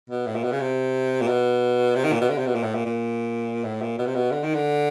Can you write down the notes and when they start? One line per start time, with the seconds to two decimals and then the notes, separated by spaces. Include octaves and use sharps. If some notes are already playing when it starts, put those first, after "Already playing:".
0.10 B2
0.26 A2
0.35 A#2
0.44 B2
0.52 C#3
0.60 C3
1.21 A#2
1.28 B2
1.95 C3
2.04 D#3
2.12 A#2
2.21 B2
2.29 D3
2.38 C3
2.46 B2
2.55 A#2
2.63 A2
2.74 A#2
2.85 A#2
3.64 A2
3.81 A#2
3.98 B2
4.06 C3
4.15 B2
4.31 D3
4.43 D#3
4.54 D3